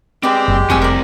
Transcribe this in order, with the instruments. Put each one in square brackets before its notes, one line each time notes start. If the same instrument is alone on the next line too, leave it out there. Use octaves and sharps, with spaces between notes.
[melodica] G#3 G4 [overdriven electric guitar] C4 G5 [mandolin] B4 D5
[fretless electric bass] F#1
[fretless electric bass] F1 [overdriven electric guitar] G3 C4 [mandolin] F#4 G#5 E6
[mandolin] A#4 D5